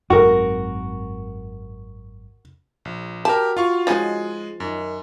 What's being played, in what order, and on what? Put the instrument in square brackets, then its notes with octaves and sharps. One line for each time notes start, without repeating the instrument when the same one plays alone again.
[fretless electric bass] G#1 F#2 [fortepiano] F#4 A#4
[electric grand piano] A#1
[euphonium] F#4 [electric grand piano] G4 A#4 [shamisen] A5
[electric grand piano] F4 F5 C#6
[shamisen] F3 C#4 D#4 [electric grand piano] G#3 G#5 A6
[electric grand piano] F#2 [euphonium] D#3